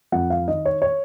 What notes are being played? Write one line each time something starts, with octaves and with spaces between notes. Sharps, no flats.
F2 F#5
F5
D#3 D#5
C#5
C#5